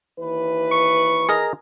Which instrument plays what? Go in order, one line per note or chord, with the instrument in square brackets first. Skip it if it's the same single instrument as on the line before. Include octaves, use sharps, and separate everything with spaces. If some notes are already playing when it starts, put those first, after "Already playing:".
[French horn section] D#2 E3 B4
[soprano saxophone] C#6
[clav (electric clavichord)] G#4 A#4 D#5 [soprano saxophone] A#5